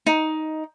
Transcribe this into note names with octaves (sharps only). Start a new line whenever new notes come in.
D#4